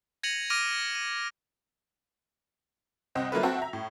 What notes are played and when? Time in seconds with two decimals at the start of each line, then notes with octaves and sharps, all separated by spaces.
0.23 G#6 A#6 C#7 D#7 F7 F#7
0.50 D6 F6 A#6 D7 D#7 F7
0.95 D#7
3.15 C2 C4 D#5 F#5
3.32 F#3 A#3 E4 F4 A4 B4
3.43 C4 F#4 E5 A5
3.58 E5 A#5
3.73 A2